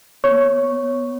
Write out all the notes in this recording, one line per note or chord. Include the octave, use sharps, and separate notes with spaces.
B3 C#5 C#6
A#3
B3